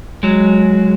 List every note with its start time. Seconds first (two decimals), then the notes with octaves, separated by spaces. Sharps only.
0.23 F#3 G#3